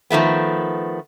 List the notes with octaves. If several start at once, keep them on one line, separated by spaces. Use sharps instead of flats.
D#3 F3 A3 B3